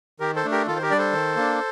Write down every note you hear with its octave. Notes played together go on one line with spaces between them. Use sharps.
D#3 G4 A#4
A4 C5
A3 D4
G4 A#4
D#3 F4 A4
C5
G4 A#4
G3 D4 D5
A4 C5
D#3
A#3 D4